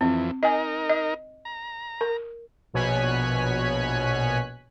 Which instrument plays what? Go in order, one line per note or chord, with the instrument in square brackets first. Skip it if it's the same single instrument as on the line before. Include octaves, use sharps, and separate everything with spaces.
[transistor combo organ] F2 E3 [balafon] C4
[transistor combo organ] D#4 A#4 [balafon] D#5 G#5
[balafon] D#5
[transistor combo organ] A#5
[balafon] A#4
[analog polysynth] A#1 B2 C#5 G#5 F#6 B6